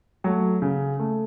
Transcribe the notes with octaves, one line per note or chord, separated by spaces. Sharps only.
F#3 A3
C#3
A3